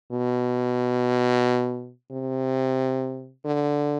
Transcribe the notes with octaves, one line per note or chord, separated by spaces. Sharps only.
B2
C3
D3